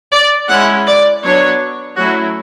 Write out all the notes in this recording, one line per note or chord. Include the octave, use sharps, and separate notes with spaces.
D5
G#3 C#4 E4 F#5
D5
F#3 B3 D4 C#5
F#3 A3 C#4 E4 F#4